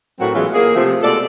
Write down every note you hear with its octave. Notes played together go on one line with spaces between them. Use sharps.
A2 F#3 C4 F#4 A#4 F#5
E3 G#3 B3 C#4 E4 F4
A#3 G#4
C3 F3 A3
B2 G#3 A4 D5